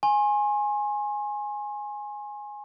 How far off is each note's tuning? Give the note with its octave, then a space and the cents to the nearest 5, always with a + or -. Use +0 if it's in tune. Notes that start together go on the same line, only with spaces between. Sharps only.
G#5 +0 C6 +40